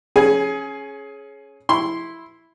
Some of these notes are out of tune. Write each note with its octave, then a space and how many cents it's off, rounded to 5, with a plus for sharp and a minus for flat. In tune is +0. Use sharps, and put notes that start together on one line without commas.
C#4 -10 G#4 +20 G#5 +0
E4 +0 C6 +0